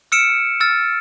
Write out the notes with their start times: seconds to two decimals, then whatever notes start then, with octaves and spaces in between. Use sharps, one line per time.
0.12 E6 F6 C#7 D7 E7
0.60 E6 F6 A6